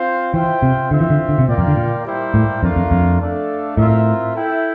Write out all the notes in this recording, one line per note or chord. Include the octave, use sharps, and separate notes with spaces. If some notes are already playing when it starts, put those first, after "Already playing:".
Already playing: C4 F4 C5 F5
E3 F4 C5 E5 G5
C3
D3 C4 F4 C5 E5
E3
D3
D3
C3
A#2 A#3 F4 A#4 D5 G5
F2
D3
A#2
G3 A#3 E4 G4 C5
A2
F2 A3 D4 F4 A#4 F5
F2
F2
A3 D4 A4 D5 F5
A2 C4 F4 A#4 E5
E4 A4 E5 G5